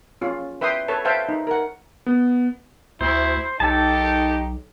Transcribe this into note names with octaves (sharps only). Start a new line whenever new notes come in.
C#4 F4
B4 E5 G5 C6 D#6
A4 B4 C#5 A5
B4 C5 E5 F5 G5 A5
D#4
A#4 F#5
B3
D2 E4 C5
B1 D#4 G4 A4 A5